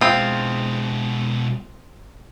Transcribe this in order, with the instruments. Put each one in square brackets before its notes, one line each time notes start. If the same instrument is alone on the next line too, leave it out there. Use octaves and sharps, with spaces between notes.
[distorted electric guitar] B2 G#3 [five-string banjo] C4 F4